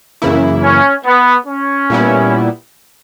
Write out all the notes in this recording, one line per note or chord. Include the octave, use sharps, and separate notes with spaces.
F#2 C#3 E3 A#3 E4
C#4
B3
C#4
A#2 G3 B3 E4